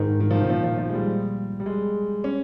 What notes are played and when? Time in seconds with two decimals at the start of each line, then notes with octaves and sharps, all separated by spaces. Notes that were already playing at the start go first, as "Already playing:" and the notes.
Already playing: G#2 D#3
0.20 D#3
0.31 F3
0.39 D#3
0.43 C3
0.49 A#2 F3
0.64 F3
0.78 F3
0.89 G#3
0.94 G3
1.60 G3
1.66 G#3
2.24 C#4